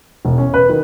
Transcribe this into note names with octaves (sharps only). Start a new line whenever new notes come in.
E1
C#4
B4
D#3